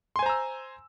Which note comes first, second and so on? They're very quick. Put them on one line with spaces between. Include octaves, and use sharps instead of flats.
C6 G#5 C5 A#5 E6